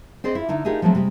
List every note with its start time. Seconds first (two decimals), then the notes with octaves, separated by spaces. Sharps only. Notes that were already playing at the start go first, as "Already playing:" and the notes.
0.24 C4 G#4 C5 D5 D#5
0.35 E4 F4
0.48 D3 D#4 E4
0.65 D#4 F4 G4 G#4 A#4 D#5
0.82 F3 F#3 G#3 A3 C4
0.95 C3 G3 G#3